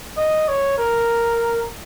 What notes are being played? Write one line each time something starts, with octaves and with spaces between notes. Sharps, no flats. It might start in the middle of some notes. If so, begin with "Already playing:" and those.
D#5
C#5
A#4